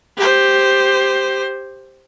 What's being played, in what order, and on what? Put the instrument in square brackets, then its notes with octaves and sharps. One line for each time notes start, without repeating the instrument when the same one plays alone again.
[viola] G4 C5